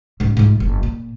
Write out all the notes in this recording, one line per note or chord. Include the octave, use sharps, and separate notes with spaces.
G#2 C#3
G#2 F4
F#1
A#2